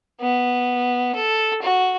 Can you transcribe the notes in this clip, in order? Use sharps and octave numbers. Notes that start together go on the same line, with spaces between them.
B3
A4
F#4